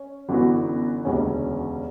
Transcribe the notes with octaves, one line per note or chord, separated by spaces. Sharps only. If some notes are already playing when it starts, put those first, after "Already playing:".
Already playing: C#4
G1 F#2 E3 B3 F#4
E1 D2 C#3 G3 C#4